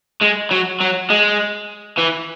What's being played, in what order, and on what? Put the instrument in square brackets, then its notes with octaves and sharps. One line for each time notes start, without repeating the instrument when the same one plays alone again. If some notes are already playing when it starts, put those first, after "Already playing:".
[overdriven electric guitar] G#3
F#3
F#3
G#3
E3